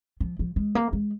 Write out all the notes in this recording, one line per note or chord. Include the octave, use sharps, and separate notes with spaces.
F3
F3
G#3
A#3
G#3